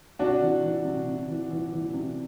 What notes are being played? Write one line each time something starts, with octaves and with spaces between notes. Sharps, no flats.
C3 D4 F#4
E3
E3
C3
C3
E3
E3
E3
C3